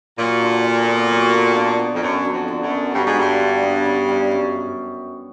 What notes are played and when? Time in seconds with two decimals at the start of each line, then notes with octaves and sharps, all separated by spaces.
0.18 A#2 F#3
0.42 D3
0.64 D3
0.88 B3
1.10 F#3
1.33 D3
1.57 D3
1.79 B3
1.94 F2
2.02 F#2 F#3
2.25 D3
2.33 F2
2.48 D3
2.64 F#2
2.71 B3
2.94 G2 F#3
3.06 G#2
3.17 G2 D3
3.39 D3
3.63 B3
3.86 C#3
4.09 G3
4.31 F#2